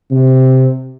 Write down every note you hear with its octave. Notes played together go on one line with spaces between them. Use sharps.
C3